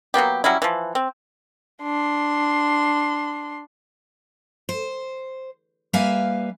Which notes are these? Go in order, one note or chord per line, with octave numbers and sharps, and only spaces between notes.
F#3 A#3 B3 G4
F#3 G3 C#4 E4
E3 F3
C4
D4 C6
C5
G3 A#3 B4 E5 F5 G#5